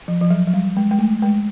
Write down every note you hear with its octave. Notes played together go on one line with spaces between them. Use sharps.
F3
F3
F#3
F#3
G3
G#3
G#3
A3
G#3